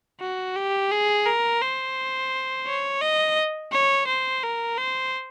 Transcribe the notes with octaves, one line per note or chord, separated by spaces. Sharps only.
F#4
G4
G#4
A#4
C5
C#5
D#5
C#5
C5
A#4
C5